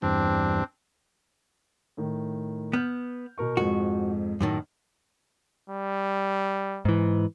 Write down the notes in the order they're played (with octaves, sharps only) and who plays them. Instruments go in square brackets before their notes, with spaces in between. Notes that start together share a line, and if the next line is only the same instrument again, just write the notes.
[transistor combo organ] E2 G2 [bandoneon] C4 D4
[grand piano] A2 D#3
[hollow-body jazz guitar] B3 [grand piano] F6 G6
[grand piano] B2 A#4 C#6
[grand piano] F2 G#2 [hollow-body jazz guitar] F#4
[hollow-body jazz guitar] F#2 A2 D#3
[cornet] G3
[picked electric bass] G#2 E3